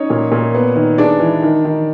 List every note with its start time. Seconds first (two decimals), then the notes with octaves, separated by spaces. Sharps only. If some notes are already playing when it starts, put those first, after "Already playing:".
Already playing: C#4 D#4 C#5
0.10 A#2
0.32 A#2
0.54 B3
0.76 D#3
0.98 G#3 D4 D5
1.20 E3
1.42 D#3
1.65 D#3